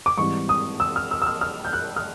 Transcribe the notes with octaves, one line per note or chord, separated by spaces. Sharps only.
D6
G#2 E3 G3 C4 C#6
D#6
E6
F6
E6
E6
F6
F6
G6
F#6
F6